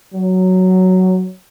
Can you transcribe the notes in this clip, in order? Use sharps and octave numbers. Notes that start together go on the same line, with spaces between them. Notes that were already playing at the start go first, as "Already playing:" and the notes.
F#3